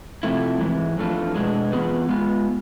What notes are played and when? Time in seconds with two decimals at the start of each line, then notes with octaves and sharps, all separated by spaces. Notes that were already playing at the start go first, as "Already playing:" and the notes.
0.23 F2 C3 F3 A3 E4
0.60 G#2 E3 G#3
0.97 F2 E3 A3 D4 F4
1.34 B2 G#3 D4 G#4
1.72 E3 B3 F4 G#4 B4
2.09 G#3 B3 F4